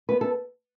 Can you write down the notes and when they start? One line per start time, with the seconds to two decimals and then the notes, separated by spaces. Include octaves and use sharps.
0.09 B3 B4
0.21 A4